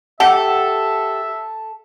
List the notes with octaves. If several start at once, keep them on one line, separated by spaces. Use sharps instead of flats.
G4 A4 E5 F#5